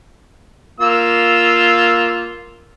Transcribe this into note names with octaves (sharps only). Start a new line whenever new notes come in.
A#3 F4 E6